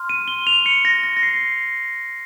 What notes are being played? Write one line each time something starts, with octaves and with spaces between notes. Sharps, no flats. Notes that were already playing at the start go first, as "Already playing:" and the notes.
Already playing: C6 F6
D#7
G7
F7
C#7
A#6
A#6
A#6
C7